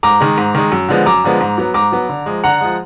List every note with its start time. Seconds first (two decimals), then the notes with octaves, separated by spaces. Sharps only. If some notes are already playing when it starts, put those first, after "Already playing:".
0.03 G#2 A#5 D6
0.20 D#3 G#3
0.37 G#2
0.55 D#3 G#3
0.72 F#2
0.89 D3 F3 G#3 B3
1.06 F#2 A#5 D6
1.24 D3 F3 G#3 B3
1.40 G#2
1.58 F#3 B3
1.74 G#2 A#5 D6
1.92 F#3 B3
2.09 D3
2.26 F3 G#3
2.44 D3 F#5 A#5
2.61 F3 G#3